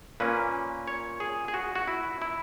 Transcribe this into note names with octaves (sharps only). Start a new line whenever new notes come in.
A#2 A#3 C#4 B4
C#5
G#4
G#4
F#4
F#4
E4
E4